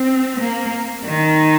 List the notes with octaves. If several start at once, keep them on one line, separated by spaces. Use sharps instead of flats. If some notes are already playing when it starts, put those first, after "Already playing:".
Already playing: C4
A#3
D#3